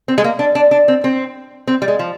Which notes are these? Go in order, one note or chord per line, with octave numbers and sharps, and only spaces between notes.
C4
G#3
A#3
D4
D4
D4
C4
C4
C4
G3
G#3
F3